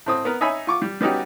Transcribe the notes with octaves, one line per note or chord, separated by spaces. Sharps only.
A2 C4 D#6
B3 A#4
D#4 C#5 E5 G#5 B5
F4 C#6 D6
G3
G3 B3 C#4 D#4 F#4 G4